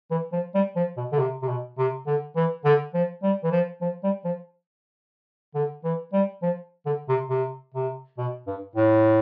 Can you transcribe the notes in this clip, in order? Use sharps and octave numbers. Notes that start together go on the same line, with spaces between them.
E3
F3
G3
F3
B2
D3
C3
C3
B2
C3
D3
E3
D3
F3
G3
E3
F3
F3
G3
F3
D3
E3
G3
F3
D3
C3
C3
C3
B2
G2
A2